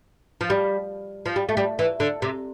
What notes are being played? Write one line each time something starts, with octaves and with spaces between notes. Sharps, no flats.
F3
G3
F3
G3
A3
G3
E3
D3
C3